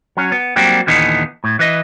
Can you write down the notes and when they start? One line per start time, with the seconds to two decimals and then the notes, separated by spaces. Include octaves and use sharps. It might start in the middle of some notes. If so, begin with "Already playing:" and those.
0.17 F#3 C#4
0.32 B3
0.56 F#3 G3 A#3 C4 G4
0.87 D#2 A#2 D3 E3 B3 D#4
1.44 A2
1.59 E3 B4 D#5